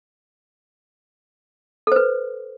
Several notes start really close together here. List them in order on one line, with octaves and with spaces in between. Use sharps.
A4 C5 B4